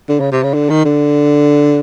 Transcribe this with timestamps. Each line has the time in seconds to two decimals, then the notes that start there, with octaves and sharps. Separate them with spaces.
0.09 D3
0.20 C#3
0.32 C3
0.43 C#3
0.54 D3
0.70 D#3
0.85 D3